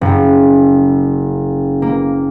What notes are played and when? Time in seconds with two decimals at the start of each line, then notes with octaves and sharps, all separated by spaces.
0.01 F#1
1.82 A#3